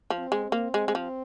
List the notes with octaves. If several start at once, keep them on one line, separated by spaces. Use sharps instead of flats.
F3
C4
G#3
C4
A#3
G#3
G#3
F3